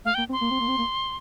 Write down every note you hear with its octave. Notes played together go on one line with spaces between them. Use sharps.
A3 F5
A#3 G5
C4
C6
A#3
C4
A#3
C4
A#3